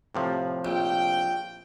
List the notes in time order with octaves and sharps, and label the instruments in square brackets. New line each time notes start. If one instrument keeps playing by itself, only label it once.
[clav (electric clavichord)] A2 C3 F3
[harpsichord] A#1 [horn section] G5